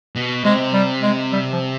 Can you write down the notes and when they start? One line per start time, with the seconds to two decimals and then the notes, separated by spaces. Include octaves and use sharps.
0.16 B2
0.44 C3 G#3
0.73 G3
1.03 G#3
1.32 G3
1.52 F3